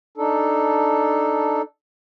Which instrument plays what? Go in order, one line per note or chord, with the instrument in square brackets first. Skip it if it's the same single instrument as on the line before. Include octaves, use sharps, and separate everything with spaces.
[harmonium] D4 D#4 A4